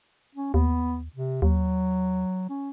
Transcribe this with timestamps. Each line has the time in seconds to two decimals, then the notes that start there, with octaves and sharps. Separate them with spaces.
0.35 C#4
0.54 D#2 B3
1.16 C3
1.42 D#2 F#3
2.49 C#4